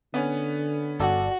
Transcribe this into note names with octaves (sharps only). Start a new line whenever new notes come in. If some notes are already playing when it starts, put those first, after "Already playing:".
D3 B3 C#4
G1 F#4 A4 D5